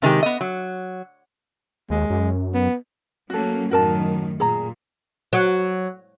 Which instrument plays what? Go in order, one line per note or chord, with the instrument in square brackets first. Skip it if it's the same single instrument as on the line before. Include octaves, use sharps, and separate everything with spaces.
[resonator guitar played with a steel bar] C3 D#3 G#3 G4
B3 D#5
F#3
[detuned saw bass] D#2 [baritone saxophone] G#3
[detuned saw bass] F#2
[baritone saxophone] B3
[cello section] F#3 A#3 C#4 [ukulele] F#4 A4
[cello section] F#2 A2 D#3 [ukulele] F#4 A#4 A5
[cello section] A#2 [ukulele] G#4 A#5
[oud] F#3